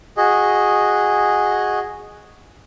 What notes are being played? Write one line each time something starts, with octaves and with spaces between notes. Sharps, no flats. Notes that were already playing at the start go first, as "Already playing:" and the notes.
F#4 G#4 D#5